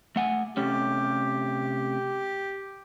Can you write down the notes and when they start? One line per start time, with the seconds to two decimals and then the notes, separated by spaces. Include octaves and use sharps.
0.16 A3 F#5 G#5
0.57 C3 A3 C#4 G4